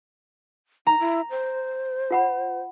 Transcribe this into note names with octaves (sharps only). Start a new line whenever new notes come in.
D#4 A#5
E4
C5
F4 F#5 B5